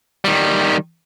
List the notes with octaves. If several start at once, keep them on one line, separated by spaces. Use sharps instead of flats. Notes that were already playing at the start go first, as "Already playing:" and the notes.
D#3 G3